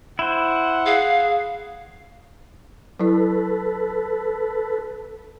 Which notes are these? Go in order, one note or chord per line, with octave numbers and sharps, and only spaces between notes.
E4 C5 F#5
G#4 F5
F#3 E4 A4 B4